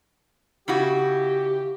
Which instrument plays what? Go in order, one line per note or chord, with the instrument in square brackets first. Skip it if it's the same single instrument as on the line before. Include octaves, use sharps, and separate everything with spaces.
[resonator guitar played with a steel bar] C#3 E4 F#4 [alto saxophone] G4